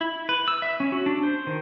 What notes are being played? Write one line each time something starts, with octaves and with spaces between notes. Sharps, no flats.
E4
B4
E6
E5
C#4
F#4
D4
C5
D#3